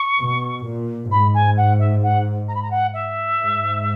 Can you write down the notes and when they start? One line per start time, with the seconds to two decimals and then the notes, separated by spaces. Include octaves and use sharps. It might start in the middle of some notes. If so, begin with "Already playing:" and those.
Already playing: C#6
0.19 B2
0.65 A#2
1.11 G#2 B5
1.34 G#5
1.57 F#5
1.79 E5
2.02 F#5
2.48 A#5
2.55 B5
2.62 A#5
2.70 F#5
2.93 E5
3.38 G#2